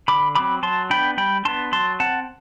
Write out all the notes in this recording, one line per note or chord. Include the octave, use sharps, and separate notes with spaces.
D3 B5 D6
F#3 C4 B5 D6
F#3 A5 C6
B3 D4 G5 B5
G3 G5 B5
B3 D4 A5 C6
F#3 A5 C6
C4 F#5 A5